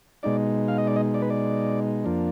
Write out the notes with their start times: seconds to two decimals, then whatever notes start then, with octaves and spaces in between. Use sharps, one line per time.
0.23 B2 G#3 D#4 D5
0.68 F5
0.78 D#5
0.87 D5
0.96 D#5
1.14 D5
1.22 B4
1.30 D5
2.04 F2 F3 A#3 D4